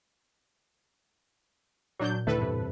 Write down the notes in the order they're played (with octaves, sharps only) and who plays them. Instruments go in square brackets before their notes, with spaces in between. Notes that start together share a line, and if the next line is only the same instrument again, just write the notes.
[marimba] A#2 [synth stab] F#3 D4 G6
[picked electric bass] D#2 D3 A3 [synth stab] A2 A4 B4
[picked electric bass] E2 G2 C3